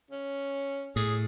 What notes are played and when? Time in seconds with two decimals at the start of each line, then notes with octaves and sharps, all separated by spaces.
0.11 C#4
0.96 A2 G#4